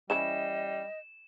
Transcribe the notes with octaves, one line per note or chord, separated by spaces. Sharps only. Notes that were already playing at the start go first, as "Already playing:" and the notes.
E3 G3 C#4 E4 D#5 E7